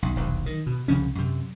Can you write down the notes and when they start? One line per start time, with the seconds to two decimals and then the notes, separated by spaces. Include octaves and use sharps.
0.02 B1
0.16 D#1 B1 E2
0.46 D#3
0.67 B2
0.88 C2 C#3 F3 C#4
1.15 F#2 C3